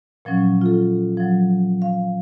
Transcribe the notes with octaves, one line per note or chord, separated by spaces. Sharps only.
A#2 F3 F#3 C#4
F4 A4
F3 F#3
F5